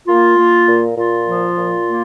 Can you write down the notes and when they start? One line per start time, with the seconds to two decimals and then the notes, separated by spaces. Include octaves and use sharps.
0.08 A#3 F4
0.38 A#3
0.67 A#2
0.96 A#2 F4
1.27 F3
1.56 A#2
1.85 A#3